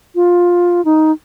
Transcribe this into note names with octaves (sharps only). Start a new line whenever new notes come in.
F4
D#4